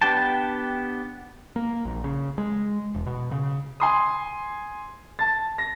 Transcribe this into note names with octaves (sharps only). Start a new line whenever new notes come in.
B3 D4 G4 G5 A5
A#3
A#1
C#3
G#3
E1
B2
C#3
G#5 C6 D#6
A5 A6
A#6